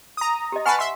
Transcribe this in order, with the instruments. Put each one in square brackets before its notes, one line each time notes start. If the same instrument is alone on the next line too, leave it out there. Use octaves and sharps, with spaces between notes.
[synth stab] A#5 D#6
[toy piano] G4 D#5
[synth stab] B4 A5 F6 [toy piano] F#5 G#5 C#6
[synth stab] E5 C6